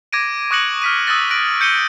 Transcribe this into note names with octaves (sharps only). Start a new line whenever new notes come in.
D6 G#6 A#6 D7 D#7
C#6 D#6 F#6 A#6 C#7 F#7
F6 B6 D#7
D#6 E6 F#6 A6 A#6
F#6 A#6 D7 F#7
G6 C#7 D#7 G7